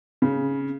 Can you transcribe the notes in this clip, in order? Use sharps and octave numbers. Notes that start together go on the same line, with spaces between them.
C#3